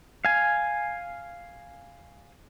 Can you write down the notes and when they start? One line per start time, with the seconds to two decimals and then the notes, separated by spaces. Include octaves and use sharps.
0.25 F5 G#5